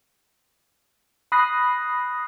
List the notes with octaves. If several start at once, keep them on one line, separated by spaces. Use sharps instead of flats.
B5 D#6 F#6 A#6 C7